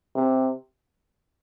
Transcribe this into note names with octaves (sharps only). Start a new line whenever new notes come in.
C3